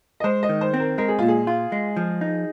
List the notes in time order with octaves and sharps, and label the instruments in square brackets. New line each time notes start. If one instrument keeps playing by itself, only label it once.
[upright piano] D#5
[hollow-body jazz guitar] G#3 [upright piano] C5
[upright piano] D#5
[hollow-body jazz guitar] D#3
[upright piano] C5
[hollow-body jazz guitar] C4
[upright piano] A#4
[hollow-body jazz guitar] G#3 [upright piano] A#4
[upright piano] G#4
[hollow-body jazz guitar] A#2 [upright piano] F4
[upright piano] G#4
[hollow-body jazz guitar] F4
G#3
F3
D#4